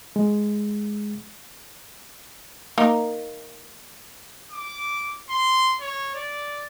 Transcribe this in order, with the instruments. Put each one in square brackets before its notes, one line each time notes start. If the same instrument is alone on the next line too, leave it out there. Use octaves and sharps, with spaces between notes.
[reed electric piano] G#3
[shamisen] A#3 D#4 A#4
[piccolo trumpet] D6
C6
C#5
D5